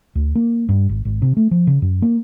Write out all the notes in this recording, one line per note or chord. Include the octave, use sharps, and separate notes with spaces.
D2
A#3
G2
G#1
G#1
C3
A3
F3
C#3
F#2
A#3